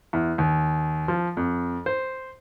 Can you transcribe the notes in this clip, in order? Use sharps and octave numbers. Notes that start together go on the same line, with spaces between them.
E2
D#2
F3
F2
C5